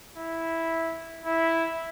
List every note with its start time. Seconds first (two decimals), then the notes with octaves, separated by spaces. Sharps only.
0.17 E4
1.26 E4